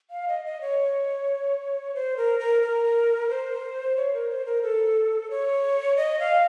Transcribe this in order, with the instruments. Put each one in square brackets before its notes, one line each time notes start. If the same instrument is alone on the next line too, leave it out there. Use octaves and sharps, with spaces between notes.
[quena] F5
D#5
D#5
C#5
C5
A#4
A#4
A#4
C5
C#5
A#4
C5
A#4
A4
C#5
D#5
F5